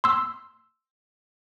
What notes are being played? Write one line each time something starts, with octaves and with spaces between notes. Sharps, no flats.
C6 E6